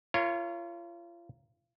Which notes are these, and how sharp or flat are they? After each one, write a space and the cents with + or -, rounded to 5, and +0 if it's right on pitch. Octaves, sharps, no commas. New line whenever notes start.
F4 -35 A#4 +0 C#5 +0